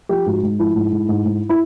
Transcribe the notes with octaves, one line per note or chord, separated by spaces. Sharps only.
F3 G4
G#2 F#4
G#2
F3 E4
G#2
G#2
G#2
G#2
E4